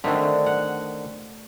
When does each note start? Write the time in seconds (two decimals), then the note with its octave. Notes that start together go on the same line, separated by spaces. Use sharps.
0.04 D3 D#3 A3 C4 D4
0.46 F#5